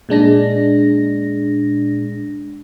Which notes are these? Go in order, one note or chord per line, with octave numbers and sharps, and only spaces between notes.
A#2 G#3 D4 A#6